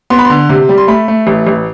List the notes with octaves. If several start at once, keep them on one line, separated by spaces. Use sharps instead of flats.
B3 C6
B5
D3 C6
C3
G3
C6
A3 B5
A3
A1
A1